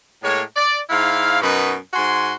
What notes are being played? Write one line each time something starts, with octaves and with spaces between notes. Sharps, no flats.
A2 G#3 A#3 C#5
D5
G#2 E4 F5
F#2 B2 D#4 F#4 B4
G#2 F#4 G#5 C6